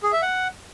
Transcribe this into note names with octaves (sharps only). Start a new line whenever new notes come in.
G#4
E5
F#5